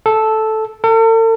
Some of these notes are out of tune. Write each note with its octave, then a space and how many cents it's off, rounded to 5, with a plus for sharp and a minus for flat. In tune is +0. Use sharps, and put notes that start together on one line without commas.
A4 -5
A4 +45